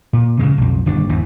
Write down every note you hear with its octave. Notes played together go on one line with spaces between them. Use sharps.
A#2
A#2 C#3 F#3 G#3
B1 F2
G1 D#2 D4
G#1 E2 E3